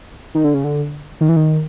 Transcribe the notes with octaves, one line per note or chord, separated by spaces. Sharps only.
D#3
D3
C#3
D3
D#3
E3
D#3